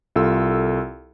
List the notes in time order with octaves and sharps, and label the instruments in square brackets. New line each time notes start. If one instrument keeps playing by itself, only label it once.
[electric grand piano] C2 F4 A4 E6